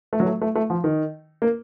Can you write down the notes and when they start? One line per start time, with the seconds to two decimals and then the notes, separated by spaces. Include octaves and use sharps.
0.13 A3
0.20 F#3
0.26 A3
0.41 A3
0.55 A3
0.70 F3
0.84 D#3
1.42 A#3